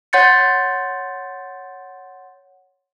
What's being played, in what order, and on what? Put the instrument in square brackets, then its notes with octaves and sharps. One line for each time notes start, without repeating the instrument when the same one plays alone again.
[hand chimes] C#5 F#5 C6 G6 A6 C#7